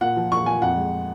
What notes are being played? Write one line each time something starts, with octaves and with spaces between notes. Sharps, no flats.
A#2 F#5
F3
A#2 C#6
A#2 G#5
F2 F#5
G#3